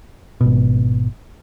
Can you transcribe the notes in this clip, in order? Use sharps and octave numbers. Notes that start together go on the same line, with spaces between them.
G#1 B2